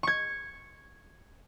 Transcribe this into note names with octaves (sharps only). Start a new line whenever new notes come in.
C#6 G#6